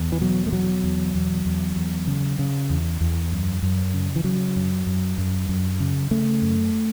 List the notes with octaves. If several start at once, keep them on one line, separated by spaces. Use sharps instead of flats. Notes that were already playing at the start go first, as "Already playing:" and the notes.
Already playing: E2
E3
B2 F#3
A3
B2 F#3
E2
E2
E2
E2
C#3
C#3
E2
E2
F#2
F#2
C#3
E3
C#3 F#3
F#2
F#2
F#2
F#2
C#3
C#3 A3
F#2